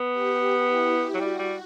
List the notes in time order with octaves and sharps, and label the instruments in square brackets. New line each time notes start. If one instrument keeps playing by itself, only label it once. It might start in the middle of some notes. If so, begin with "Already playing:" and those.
Already playing: [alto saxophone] B3
[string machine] G4
E4
[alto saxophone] F#3
[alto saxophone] G3 [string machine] F#4
[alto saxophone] G3